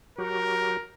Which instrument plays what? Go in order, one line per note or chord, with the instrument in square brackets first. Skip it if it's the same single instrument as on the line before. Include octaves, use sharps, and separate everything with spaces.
[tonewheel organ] F#3 F#4 G4 [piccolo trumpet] A#4